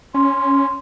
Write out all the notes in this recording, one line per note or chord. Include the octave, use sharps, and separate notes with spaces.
C#4 C6